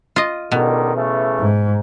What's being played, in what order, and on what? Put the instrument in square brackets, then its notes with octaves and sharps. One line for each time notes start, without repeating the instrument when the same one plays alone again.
[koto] F4 D#5
[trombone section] C#2 D3 D#3 [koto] B2
[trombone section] C#3 E3 A3
[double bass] G#2